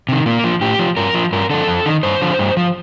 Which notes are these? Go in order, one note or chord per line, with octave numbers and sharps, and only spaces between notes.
C3 D#3
A#2 A#3
F3
A2 G4
F3
G2 A#4
F3
G2 A#4
D3 F3 A4
F2
D#3
G2 C5
D3 F3
G2
F3